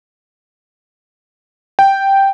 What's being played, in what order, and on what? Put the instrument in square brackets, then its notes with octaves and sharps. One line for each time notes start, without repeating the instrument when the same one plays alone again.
[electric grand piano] G5